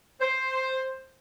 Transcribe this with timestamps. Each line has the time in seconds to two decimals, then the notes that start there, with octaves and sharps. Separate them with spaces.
0.21 C5